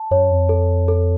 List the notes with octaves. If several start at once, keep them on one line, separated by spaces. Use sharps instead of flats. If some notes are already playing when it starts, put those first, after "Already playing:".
Already playing: A5
F#2 C#5
F2
A4
A4